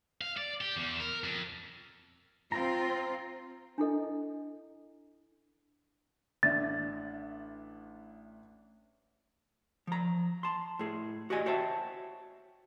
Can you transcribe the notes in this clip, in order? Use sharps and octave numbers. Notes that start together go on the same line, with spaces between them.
F5
D5
G4
E2
A#4
F2
C4 F4 G5 A#5
D4 E4 A4 D#5
A1 D4 E5 A6
F3 A#5
A5 C6
A2 G#4
F#4 G4 D5 D#5 G#5
F#4 C5 C#5 E5 G5 A5